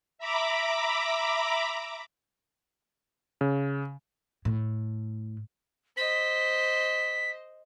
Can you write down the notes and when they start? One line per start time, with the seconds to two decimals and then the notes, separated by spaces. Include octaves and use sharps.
0.18 E5 A#5 B5 D6
3.41 C#3
4.45 A2
5.97 C5 D#5 B6